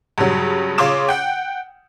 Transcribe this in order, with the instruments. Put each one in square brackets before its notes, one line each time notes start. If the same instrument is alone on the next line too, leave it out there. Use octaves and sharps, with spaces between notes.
[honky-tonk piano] G2 C#3 F#3
C#3 F4 C#5 C6 D6 E7
F#5 G5